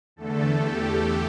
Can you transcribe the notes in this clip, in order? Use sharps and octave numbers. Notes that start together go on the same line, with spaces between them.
E2 D3 A3 A4
G4